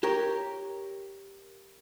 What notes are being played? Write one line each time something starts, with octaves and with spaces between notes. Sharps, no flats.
G4 A#4 C#5